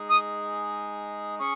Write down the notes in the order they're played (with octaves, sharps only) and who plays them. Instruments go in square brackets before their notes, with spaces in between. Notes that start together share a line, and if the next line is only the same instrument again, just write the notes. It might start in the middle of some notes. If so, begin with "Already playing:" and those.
Already playing: [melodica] G#3 D#4 G#4
[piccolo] D#6
[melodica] C#4 G#4 [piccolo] C#6